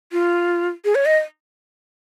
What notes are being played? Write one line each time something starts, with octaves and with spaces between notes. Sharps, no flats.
F4
G#4
C#5
D#5